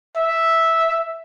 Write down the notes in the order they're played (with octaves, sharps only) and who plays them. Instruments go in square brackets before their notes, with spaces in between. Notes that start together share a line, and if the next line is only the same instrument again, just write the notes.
[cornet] E5